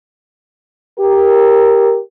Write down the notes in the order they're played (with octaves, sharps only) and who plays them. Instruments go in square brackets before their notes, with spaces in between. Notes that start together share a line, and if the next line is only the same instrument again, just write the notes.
[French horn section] G4 A#4